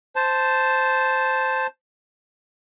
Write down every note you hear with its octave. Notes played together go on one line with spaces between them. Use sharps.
C5 A5